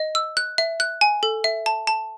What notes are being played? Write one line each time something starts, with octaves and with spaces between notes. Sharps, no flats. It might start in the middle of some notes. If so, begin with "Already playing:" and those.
Already playing: D#5
E6
F#6
E5
F#6
G#5
A4
E5
A5
A5